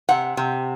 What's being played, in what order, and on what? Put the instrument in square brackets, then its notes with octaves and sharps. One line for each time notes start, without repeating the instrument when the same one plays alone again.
[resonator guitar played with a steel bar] C3 F#5
C3